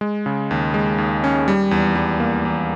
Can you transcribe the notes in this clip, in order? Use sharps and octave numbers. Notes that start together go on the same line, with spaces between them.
G#3
C#3
D#2
G#3
D#2
C#4
G3
E2
G3
A#3
E2